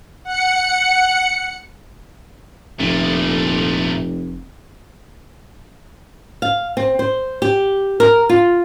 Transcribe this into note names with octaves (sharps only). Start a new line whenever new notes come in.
F#5 C#7
F1 A#2 A3
F5
C4
C5
G4
A#4
F4